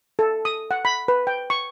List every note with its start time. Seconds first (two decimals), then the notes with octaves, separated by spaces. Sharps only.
0.19 A4
0.45 D#6
0.71 F#5
0.85 B5
1.08 B4
1.27 G5
1.50 C#6